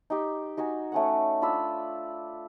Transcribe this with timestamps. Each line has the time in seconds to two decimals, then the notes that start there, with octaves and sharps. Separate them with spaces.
0.10 D#4 G4
0.57 D#4 F#4 G#5
0.92 A3 C#4 F#5
1.42 D4 F4 B5 E6